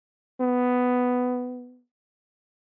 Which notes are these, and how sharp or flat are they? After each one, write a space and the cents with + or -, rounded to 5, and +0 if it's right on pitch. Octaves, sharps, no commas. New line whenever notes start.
B3 +10